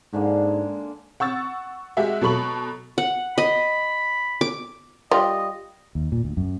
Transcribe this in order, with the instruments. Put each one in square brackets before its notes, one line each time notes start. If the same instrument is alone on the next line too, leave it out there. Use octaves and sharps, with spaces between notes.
[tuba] G#2 [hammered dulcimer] D3 G#3 A#3
[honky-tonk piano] F#5 C#6 E6 A6
G#3 F#4 G4 E5 F#5
B2 F#3 A4 B5 C#6 F#7
[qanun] F#5
[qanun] D#5 [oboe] B5
[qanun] D6
[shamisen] G3 F4 [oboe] D#5
[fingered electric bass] D#2
A#2
D2
F#2